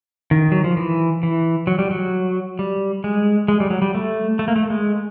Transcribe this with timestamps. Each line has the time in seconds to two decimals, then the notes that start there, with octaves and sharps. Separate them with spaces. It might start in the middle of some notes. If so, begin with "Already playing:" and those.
0.31 D#3
0.52 F#3
0.64 F3
0.77 E3
1.23 E3
1.67 F#3
1.79 G3
1.91 F#3
2.59 G3
3.04 G#3
3.48 G#3
3.60 G3
3.70 F#3
3.82 G3
3.95 A3
4.39 A3
4.48 A#3
4.56 A3
4.70 G#3